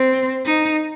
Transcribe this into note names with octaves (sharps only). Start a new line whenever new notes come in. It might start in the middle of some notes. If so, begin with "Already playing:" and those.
Already playing: C4
D#4